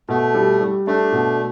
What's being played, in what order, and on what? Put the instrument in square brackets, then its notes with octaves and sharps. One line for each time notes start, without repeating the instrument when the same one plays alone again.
[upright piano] B2 [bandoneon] A3
[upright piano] G3
G3
[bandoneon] A3 [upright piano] D4
[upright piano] B2